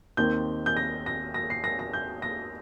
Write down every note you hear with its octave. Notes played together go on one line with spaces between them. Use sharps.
D#2 D#3 C4 D#4 G6
G6
A#6
A#6
A#6
C7
A#6
A#6
G6
A#6